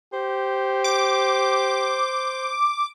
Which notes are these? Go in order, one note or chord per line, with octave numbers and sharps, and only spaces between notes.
G4 C5
D6